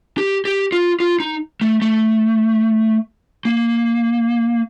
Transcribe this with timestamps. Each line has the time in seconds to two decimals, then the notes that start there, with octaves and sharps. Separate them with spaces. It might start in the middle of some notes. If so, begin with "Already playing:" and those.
0.18 G4
0.45 G4
0.72 F4
1.00 F4
1.20 D#4
1.61 A3
1.82 A3
3.45 A#3